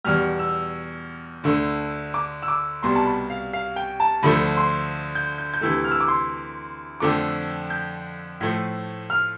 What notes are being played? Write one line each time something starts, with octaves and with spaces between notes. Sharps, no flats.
E2 B2 G3 F6
E6
D2 D3 A3
D6
E6
D6
C2 B2 G3 C6
A5
B5
F5
F5
G5
A5
D2 D3 F3 A3 B5
C6
G6
G6
G6
D2 C3 E3 A3 E6
F6
E6
D6
C6
F2 D3 F3 A3 D6
G6
A2 F3 A3
F6